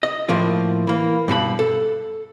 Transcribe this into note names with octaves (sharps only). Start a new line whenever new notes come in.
D#5
A2 F3 A#3 F4
E3 A#3
G2 B2 F#4 B5
A4